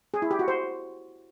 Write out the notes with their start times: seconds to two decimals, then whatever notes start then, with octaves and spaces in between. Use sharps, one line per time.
0.14 G#4
0.22 E4
0.31 G4
0.39 F#4
0.48 C5